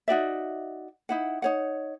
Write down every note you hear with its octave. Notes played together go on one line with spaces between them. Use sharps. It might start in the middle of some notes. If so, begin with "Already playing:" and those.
D#4 F#4 D5 E5
D#4 E4 F#5
D#4 C#5 F#5